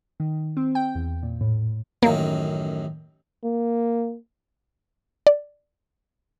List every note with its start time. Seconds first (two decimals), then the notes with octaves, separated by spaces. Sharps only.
0.20 D#3
0.57 C4
0.75 G5
0.95 E2
1.23 A#2
1.41 A2
2.03 A1 F#2 D#3 A#3
3.44 A#3
5.27 D5